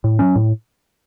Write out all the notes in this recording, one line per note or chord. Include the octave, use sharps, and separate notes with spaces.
A2
F#3 C#4
A2